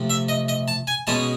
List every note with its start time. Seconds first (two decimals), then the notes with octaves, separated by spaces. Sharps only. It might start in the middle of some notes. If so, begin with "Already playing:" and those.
Already playing: C3 F3 A3
0.10 E5
0.29 D#5
0.48 D#5
0.68 A5
0.87 G#5
1.07 B2 G#3 C#4 A5